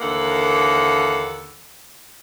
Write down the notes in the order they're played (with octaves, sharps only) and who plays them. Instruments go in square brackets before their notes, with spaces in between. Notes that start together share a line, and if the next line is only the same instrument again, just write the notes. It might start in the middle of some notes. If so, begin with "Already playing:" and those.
[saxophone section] D#2 D3 E3 A#3 A4 F#5